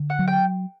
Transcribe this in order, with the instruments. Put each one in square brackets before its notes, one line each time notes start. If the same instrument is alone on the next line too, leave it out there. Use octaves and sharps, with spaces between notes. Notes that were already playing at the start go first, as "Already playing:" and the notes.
Already playing: [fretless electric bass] D3
[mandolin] F#5
[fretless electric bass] F#3
[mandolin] G5